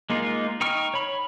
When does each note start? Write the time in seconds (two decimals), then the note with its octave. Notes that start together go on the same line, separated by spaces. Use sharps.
0.10 G#3 A#3 D#4 F4
0.61 D#4 G5 C#6 F6
0.94 C#5 B5